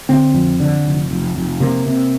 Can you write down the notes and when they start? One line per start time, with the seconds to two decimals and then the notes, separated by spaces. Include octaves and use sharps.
0.09 D3 C4
0.34 F2
0.60 D3
0.85 F1
1.11 F1
1.36 F1
1.60 C3 A#3
1.86 C3